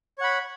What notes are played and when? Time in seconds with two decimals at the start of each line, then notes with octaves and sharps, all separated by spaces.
0.18 C#5
0.21 F#5
0.24 B5